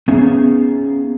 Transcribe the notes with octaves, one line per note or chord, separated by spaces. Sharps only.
B3 C#4 D#4 G#4 E5 F5